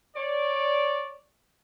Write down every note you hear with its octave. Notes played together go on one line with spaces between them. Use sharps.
C#5 D5